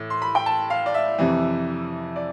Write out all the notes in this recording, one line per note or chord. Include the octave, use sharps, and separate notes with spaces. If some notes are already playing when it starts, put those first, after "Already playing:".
Already playing: A2 E3
C6
B5
G5
A5
F5
D5
E5
F2 C3 E3
D5